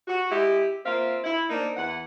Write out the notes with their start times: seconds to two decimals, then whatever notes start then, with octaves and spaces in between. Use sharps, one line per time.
0.08 F#4
0.30 G#3 E4 G4
0.86 A#3 C4 F4 E5 F5
1.24 E4
1.50 A#3 C4 D4 D#4
1.77 E2 E3 F#5